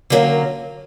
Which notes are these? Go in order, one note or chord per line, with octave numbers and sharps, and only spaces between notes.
D3 F#3 A#3 C#4